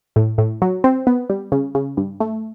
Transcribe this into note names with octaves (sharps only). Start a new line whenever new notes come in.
A2
A2
F#3
C4
B3
G3
C#3
C#3
G2
A3